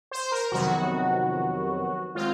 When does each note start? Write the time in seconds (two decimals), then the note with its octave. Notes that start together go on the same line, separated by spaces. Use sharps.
0.11 C5
0.32 A#4
0.52 F2 C3 D#3 F#3 B3 F#4
2.15 D#3 G#3 C4 F4